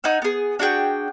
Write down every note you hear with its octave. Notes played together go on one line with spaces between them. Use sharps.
D#4 F#5 G#5 E6
B3 G#4
D4 F#4 G#4 G5